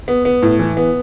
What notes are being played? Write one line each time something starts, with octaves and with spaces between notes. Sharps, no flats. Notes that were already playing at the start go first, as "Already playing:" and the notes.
B3
B3
A2
E3
B3